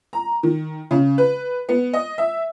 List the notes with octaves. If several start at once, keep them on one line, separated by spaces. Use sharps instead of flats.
A#5
D#3
C#3
B4
B3
D#5
E5